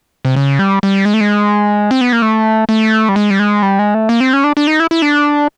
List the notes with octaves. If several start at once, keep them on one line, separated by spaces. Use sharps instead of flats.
C3
C#3
G3
G3
G#3
A3
G#3
C4
B3
A#3
A3
A3
G3
G#3
G3
G#3
G3
G#3
A3
A#3
C4
C#4
D4
D4
D#4
E4
E4
D4